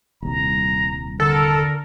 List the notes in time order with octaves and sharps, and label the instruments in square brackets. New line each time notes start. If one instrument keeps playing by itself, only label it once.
[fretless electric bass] D#1 C2 [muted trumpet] A#5
[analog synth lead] D3 [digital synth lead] A4 [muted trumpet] A#4